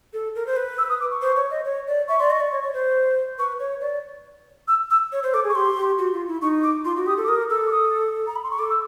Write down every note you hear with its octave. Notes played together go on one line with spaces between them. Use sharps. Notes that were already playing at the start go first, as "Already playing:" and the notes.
A4
A#4
C5
B4
E6
D#6
D6
C#6
C5
C#5
D#5
C#5
D5
E5 C#6
D5 C6
D#5 C#6
D5
C#5
C#5
C5
B4 C#6
C#5
D5
E6
E6
C#5
C5
A4 D6
G#4
C#6
G4 C6
G4
F#4
F4
E4
D#4 C#6
D6
F4 C6
F#4
G4 D#6
A4
D6
A#4 D#6
A4 E6
D6
D#6
A#5
B5
C6
C#6
A4 D6
E6